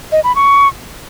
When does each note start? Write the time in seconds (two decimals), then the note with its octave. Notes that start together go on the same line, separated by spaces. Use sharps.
0.12 D#5
0.24 B5
0.36 C#6